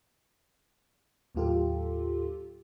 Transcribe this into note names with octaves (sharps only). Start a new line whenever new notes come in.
D#2 A2 F#3 F4 G4 A4